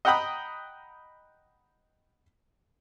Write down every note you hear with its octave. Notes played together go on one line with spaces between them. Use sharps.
D#5 F#5 G5 A#5 B5 D#6